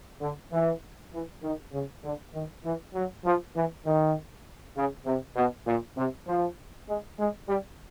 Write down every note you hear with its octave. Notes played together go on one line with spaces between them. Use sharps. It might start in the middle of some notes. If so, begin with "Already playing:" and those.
D3
E3
E3
D#3
C#3
D3
D#3
E3
F#3
F3
E3
D#3
C#3
C3
B2
A#2
C3
F3
G#3
G#3
G3